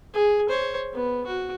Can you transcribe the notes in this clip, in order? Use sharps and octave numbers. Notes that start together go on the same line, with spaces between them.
G#4
C5 C#5
B3
F#4